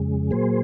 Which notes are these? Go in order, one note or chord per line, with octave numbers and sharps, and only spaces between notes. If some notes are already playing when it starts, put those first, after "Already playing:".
Already playing: F2 C#3 G#3
A#2 F#3 A#3 G#4 C5